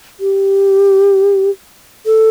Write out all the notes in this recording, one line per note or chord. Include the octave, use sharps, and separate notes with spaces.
G4
A4